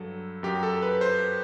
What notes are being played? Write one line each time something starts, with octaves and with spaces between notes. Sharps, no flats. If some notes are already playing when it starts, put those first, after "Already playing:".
Already playing: G2 F#3 A4
F#2 F#3 G4
A4
B4
C5